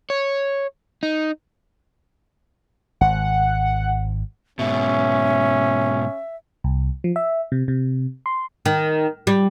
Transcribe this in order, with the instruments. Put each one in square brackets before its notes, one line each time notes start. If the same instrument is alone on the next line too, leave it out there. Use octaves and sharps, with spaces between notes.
[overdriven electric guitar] C#5
D#4
[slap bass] G#1 [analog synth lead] F#5
[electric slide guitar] G#2 B2 [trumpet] C#4 [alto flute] E5
[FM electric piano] C2
F3
E5
C3
C3
C6
[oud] D#3
G3